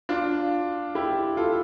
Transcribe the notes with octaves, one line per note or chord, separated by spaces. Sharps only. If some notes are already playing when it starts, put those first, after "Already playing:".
D4 F4
E4 G4
F4 A4